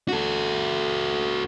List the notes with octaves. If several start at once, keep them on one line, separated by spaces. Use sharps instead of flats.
F#4 A4